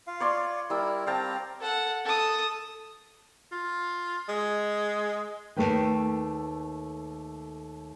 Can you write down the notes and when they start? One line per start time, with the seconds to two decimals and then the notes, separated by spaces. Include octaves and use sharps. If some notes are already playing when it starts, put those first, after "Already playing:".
0.07 F4 F5
0.20 C#5 D5 C6
0.70 G3 E4 A#4 E6
1.07 C4 F5 G5 A5 A#5
1.61 A4 F#5
2.05 A4 D#6
3.52 F4
4.29 G#3
5.56 D#2 A#2 A3 D#4 B4 G5